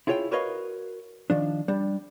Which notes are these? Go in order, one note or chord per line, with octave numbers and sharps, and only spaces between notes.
E4 F4 G#4 C#5 E5 G5
F#4 A#4 B4 C#5 D#5 F5
D#3 F3 D4
G3 D4